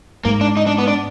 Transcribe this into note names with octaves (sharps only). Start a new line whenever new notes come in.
G#2 A#3
D4
D#4
D4
B3
D4